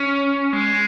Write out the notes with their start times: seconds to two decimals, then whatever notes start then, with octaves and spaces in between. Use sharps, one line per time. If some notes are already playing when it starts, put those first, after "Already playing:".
Already playing: C#4
0.53 G#3